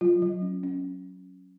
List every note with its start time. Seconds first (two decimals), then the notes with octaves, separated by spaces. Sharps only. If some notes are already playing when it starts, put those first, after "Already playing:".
0.01 F#3 F4
0.22 F#3
0.42 C#4
0.63 C#4